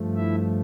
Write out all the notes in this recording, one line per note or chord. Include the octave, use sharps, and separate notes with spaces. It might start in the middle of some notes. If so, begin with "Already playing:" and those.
Already playing: G2 F3 A3
E4 E5